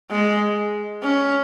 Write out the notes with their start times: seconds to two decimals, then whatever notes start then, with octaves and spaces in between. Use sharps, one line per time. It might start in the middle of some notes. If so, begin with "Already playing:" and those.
0.11 G#3
1.03 C#4